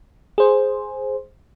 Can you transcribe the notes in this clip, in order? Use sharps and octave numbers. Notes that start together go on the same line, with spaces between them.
G#4 C5